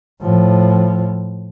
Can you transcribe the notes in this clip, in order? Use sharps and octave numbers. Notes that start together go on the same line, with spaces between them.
A2 F3